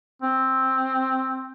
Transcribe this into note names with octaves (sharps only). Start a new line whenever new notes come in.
C4